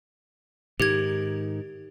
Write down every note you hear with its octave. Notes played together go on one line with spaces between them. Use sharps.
G#2 D#3 G4 G#6